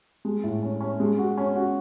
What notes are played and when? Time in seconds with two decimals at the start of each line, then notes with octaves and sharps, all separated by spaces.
0.25 G#3
0.43 A2
0.63 C#4
0.81 C#4
1.00 G#3
1.19 F#4
1.38 C#4
1.56 F#4